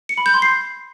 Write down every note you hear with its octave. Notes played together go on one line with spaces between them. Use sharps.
C#7
B5
G6
C6
C7